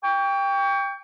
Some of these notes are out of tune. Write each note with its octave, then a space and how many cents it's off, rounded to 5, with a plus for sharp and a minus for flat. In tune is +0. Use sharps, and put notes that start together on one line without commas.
G5 +15 C#6 +35